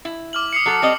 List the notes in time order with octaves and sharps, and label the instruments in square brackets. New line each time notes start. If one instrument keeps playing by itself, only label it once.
[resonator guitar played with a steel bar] E4
[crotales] D6 F6 F#7
D#6 C7 C#7
[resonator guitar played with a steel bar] F#3 A4
G3 C4 D#5